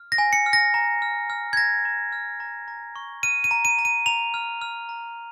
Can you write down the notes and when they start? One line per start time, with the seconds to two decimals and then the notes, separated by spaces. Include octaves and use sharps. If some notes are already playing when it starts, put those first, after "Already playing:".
Already playing: F6
0.12 A#6
0.18 G#5
0.33 C#7
0.46 F6
0.53 A#6
0.74 A#5
1.02 F6
1.30 F6
1.53 G#6
1.57 A#5 A#6
1.85 A#5
2.12 F6
2.40 A#5
2.68 A#5
2.96 C#6
3.23 F6 D#7
3.44 D#7
3.51 A#5
3.65 D#7
3.79 A#5
3.85 D#7
4.06 A#5 F7
4.34 F6
4.62 F6
4.89 A#5